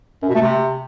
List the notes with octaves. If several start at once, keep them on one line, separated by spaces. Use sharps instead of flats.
F#2
B2
A3
C3